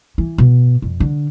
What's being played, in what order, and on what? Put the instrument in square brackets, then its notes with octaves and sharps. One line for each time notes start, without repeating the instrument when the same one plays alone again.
[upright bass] E3
B2
F2
D3